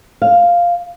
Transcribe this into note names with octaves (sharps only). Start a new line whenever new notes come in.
F5